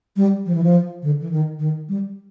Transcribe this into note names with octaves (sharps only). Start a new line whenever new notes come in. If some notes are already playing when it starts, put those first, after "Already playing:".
G3
F3
E3
F3
D3
E3
D#3
D#3
G3